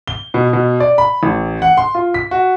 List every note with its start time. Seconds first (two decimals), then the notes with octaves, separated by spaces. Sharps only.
0.08 G7
0.34 B2
0.53 B2
0.80 D5
0.98 B5
1.23 A1
1.62 F#5
1.77 C6
1.95 F4
2.14 B6
2.31 F#4